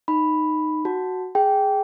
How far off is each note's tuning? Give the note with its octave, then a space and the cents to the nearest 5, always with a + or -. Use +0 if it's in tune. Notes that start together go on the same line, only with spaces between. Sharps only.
D#4 -10 B5 +0
F#4 +0 A5 +0
G#4 +0 G5 -10